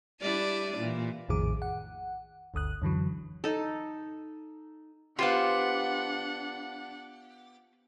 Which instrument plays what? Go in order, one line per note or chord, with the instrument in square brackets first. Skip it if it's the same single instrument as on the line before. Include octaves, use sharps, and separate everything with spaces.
[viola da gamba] G3 D4 E4 [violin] D5 D#7
[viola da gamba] A#2 E3
[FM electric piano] A#1 F2 A2 D#3 G#4 D6
F#5
G1 D2 D#6 F#6
F#2 D3 E3 F#3
[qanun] D#4 A4
[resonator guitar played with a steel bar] B3 G4 [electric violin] D4 F#5 [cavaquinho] F4 C5 F5